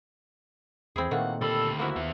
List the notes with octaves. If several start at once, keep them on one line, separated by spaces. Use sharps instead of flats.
E2 C4 E4 G#4
A#2 D#3 E3 A3 A#3 F#5
D2 G3 A4 B5
F3 A#3 E4 F#4
D#2 B3 E5